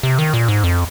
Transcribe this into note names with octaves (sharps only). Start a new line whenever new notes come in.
C3
D#3
A#2
G#2
F2